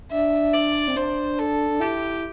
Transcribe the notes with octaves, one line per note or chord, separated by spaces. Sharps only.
D4 E5
D5
C4
D4 C5
A4
D4
E4 G4